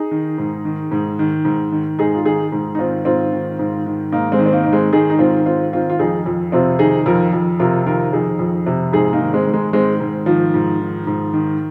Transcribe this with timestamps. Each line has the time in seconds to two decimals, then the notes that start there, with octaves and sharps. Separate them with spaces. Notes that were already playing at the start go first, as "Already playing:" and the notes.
Already playing: D#4 G#4
0.11 D#3
0.38 G#2
0.65 D#3
0.91 G#2
1.19 D#3
1.45 G#2
1.72 D#3
1.99 G#2 D#4 G#4
2.15 F4
2.25 D#3 D#4 G#4
2.52 G#2
2.75 D#4
2.79 D#3 C4 F4
3.05 G#2 C4 F4
3.33 D#3
3.59 G#2
3.86 D#3
4.12 G#2 A#3 D#4
4.32 G#3 C4
4.39 D#3
4.46 C4
4.53 A#3 D#4
4.64 G#2 D#4
4.72 G#3 C4
4.92 D#3 D#4 G#4
5.10 D#4
5.19 G#2 C4 F4
5.46 D#3 C4 F4
5.73 D#3 C4 F4
5.90 F4
5.99 F2 D#4 G#4
6.26 F2
6.52 C3 C4 F4
6.79 D#3 D#4 G#4
7.06 F2 F4 A#4
7.33 F2
7.59 C3 F4 A#4
7.86 D#3 F4 A#4
8.13 F2 D#4 G#4
8.39 F2
8.66 C3
8.93 G#2 D#4 G#4
9.13 A#3 D#4
9.20 D#3
9.33 G#3 C4
9.47 G#2
9.53 G#3
9.73 D#3 G#3 C4
10.00 G#2
10.26 D#3 F3
10.54 G#2
10.80 D#3
11.07 G#2
11.33 D#3